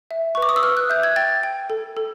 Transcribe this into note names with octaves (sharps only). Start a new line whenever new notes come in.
E5
C#6
B4
D6
D#6
E6
B4 F6
F#6
E5 G6
G#6
G5 A6
G5
A4
A4